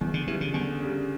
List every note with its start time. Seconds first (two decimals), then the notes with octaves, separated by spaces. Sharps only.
0.01 E2 E3
0.14 D3
0.27 C#3 E3 G3
0.41 D3
0.54 E2 D3
0.80 C#3 G3